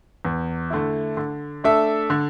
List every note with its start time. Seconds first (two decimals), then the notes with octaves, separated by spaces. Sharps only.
0.25 E2
0.70 D3 A3 E4
1.17 D3
1.64 A3 D4 A4 E5
2.10 D3